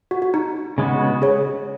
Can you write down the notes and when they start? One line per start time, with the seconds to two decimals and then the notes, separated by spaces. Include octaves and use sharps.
0.11 F#4
0.22 F#4
0.34 D#4
0.78 C#3 G#3 B3 F#4
1.22 G#4 C#5